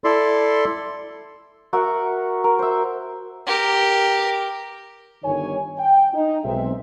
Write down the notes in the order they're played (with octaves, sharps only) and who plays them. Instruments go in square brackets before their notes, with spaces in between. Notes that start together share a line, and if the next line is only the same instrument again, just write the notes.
[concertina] E4 A4 D5 C6
[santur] F#4 A#4 E5 F#5
A#4
C5 E5
[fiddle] G4 A#4
[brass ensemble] G1 D#3 C#5 G#5
G5
D#4
B1 G#3 C4 E5